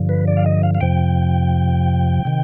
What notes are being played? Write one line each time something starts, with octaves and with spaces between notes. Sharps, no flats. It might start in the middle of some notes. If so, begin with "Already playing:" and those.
Already playing: G2 D3 F3
B4
D5
F5
D#5
F5
F5
F2 C3 F3 G5
C3 D#3